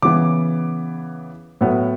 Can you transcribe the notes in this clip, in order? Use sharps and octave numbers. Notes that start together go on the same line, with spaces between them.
C#3 E3 B3 D6
A2 F#3 B3